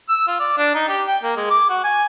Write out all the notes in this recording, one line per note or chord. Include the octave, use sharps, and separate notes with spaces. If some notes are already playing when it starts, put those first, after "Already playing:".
E6
F4
D5
D4
D#4
G4
G5
A#3
G#3
D6
F#4
G#5